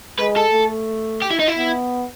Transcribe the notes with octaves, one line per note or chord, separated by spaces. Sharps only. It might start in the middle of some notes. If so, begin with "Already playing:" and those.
G#3 B4
A4
A3
G4
E4
D#4
E4
B3